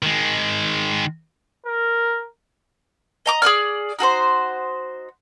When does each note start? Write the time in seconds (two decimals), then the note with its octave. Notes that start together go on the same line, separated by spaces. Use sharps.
0.03 D#3 G#3
1.66 A#4
3.26 D#5 A#5 D6 D#6
3.42 G#4 B4 D5 F6
3.99 D#4 F#4 A4 C5